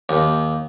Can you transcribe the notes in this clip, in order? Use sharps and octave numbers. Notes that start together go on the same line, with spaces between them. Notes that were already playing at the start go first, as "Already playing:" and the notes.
D#2